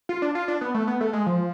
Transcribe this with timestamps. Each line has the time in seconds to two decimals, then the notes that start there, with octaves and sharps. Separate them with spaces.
0.09 F4
0.22 D4
0.35 F4
0.48 D4
0.61 B3
0.74 A3
0.87 B3
1.01 A3
1.13 G#3
1.26 F3